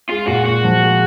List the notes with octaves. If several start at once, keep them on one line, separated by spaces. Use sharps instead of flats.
G#3 F4
A#2 F#4
A#2 F#4
F3
G#3